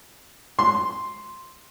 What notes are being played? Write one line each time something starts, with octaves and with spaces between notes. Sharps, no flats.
C6